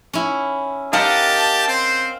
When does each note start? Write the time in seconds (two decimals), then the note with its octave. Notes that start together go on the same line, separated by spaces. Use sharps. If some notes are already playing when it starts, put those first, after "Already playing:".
0.13 C#4 E4
0.93 G4 A#4 D#5 F5 F#5 A5
1.68 C4 C5